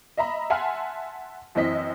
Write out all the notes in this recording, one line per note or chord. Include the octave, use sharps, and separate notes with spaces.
D#5 E5 A#5 B5
E5 F#5 G#5 A5 C6 F6
F#2 E3 C4 D#5 B6